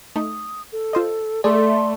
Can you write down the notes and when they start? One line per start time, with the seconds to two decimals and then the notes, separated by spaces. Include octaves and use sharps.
0.16 A3 D#4 D#6
0.72 A4
0.93 F4 C5 D#5
1.44 A3 G#4 A4 D5 C6